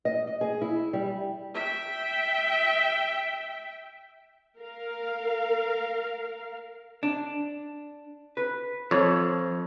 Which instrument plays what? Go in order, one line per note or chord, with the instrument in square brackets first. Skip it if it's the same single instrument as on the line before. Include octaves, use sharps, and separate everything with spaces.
[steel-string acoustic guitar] D#5
D#5
G#4
E4
G3
[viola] E5 G5
[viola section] A#4 F5
[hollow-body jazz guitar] D4
B4
[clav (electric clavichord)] F2 C#5 [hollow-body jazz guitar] F3